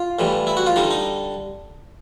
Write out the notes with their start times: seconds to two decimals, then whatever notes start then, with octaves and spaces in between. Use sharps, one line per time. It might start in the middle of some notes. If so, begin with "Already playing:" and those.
Already playing: F4
0.19 A2 E3 G3
0.47 E4
0.57 F#4
0.67 F4
0.76 D3 G3 D#4
0.91 D#4